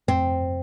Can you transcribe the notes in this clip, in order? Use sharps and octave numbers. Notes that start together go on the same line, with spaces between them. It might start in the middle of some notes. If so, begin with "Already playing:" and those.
F2 C4